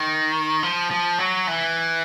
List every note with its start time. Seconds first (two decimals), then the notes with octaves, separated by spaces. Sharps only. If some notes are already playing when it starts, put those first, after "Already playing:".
Already playing: D#3
0.63 F3
0.91 F3
1.18 F#3
1.47 E3